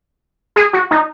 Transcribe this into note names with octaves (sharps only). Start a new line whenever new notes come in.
G#4
F#4
D#4